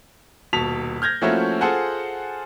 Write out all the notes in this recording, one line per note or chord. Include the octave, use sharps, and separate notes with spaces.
D#1 B2 A5 B6 F7
F6 G6 G#6 A#6
F3 A3 A#3 C#4 E4 F#4
F4 G#4 A4 C5 F#5 G#5